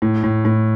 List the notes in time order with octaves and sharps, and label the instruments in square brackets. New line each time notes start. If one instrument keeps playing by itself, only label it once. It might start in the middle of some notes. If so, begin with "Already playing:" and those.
[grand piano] A2
A2
A2